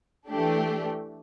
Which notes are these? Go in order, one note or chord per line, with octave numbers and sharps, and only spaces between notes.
E3 A3 D4 G4